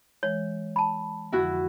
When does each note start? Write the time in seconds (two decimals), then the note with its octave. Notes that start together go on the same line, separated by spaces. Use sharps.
0.23 E3 G#3 C#5
0.76 A5 B5
1.32 F2 D3 F3 E4 F#4